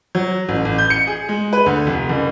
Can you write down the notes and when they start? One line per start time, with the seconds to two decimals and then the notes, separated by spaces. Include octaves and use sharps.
0.15 F#3
0.49 A1
0.65 A1
0.78 G6
0.90 C#7
1.07 G#4
1.29 G#3
1.53 B4
1.66 D2
1.87 F1
2.09 F#1